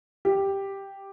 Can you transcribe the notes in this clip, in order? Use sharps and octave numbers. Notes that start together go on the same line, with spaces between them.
G4